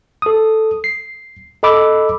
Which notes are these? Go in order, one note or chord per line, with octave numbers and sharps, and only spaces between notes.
A4 D#6
C7
A4 D#5 B5 D6 E6